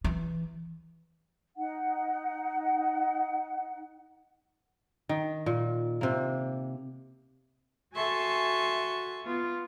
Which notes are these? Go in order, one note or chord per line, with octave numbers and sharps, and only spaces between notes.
E3
D#4 F#5
D#3
A#2
C3 A#3
F#4 A4 E5 G#5 C6 C#6
B3 F4